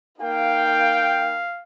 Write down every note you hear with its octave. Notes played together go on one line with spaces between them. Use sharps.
A#3 D#4 F5 G5